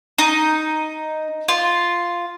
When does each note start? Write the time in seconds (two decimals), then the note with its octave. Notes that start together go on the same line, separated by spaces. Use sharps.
0.18 D#4
1.48 F4